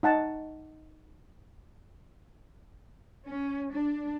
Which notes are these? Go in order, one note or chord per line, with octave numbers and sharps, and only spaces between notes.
D#4 F#5 A5
C#4
D4